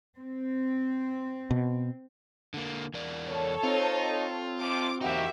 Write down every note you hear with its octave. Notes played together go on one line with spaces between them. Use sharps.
C4
B2
D3 A#3
E2 A#4 D5
A4 C#5
C4 D#4 F4
F2 C3 F3 D6
E2 A#3 D#4 E4 F#4 G4 E5